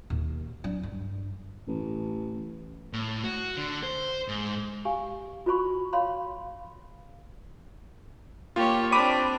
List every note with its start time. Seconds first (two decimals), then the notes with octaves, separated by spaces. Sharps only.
0.10 D#2 B2
0.64 F#3 D4
0.83 G2
1.68 A1
2.93 A2
3.24 F#4
3.57 D3
3.83 C5
4.28 G#2
4.85 G4 F5 G#5
5.46 F4 F#4 C5 B5 C#6
5.93 C#5 F5 B5 C6
8.56 A#3 F4 G4 C#5
8.92 C4 D4 B5 D6 D#7